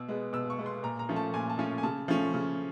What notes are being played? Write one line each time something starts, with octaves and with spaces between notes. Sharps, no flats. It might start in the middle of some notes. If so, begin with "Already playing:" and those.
Already playing: B2 E6
G#3 B3
B2 E6
C#6
G#3 B3
C6
A#2 A#5
A#5
F3 A3 C#4
A5
A#2 G#5
A5
F3 A3 C#4 G#5
G#5
C#3 A5
F3 A3 C#4
C#3